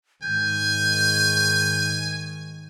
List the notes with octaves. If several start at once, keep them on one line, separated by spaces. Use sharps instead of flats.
G#2 D#3 G#5 G6